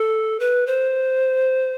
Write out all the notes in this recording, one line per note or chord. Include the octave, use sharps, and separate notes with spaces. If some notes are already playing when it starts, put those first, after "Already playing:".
Already playing: A4
B4
C5